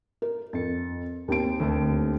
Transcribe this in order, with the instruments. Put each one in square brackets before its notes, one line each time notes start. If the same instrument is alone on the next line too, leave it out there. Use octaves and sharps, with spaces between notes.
[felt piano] A#4
[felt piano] F2 [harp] A6 C#7
[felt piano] D#2 C4 D7
[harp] D2 A3